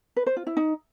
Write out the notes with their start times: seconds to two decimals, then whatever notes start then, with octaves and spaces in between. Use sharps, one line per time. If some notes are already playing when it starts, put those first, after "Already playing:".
0.16 B4
0.27 C5
0.37 F4
0.47 E4
0.57 D#4